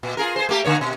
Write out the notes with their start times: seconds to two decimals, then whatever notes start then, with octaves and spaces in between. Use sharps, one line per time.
0.03 A#2
0.17 F4 G#4 A#4
0.36 G#4 C5
0.49 A3 A#3 G4
0.64 D3 A#3 C#5
0.81 B2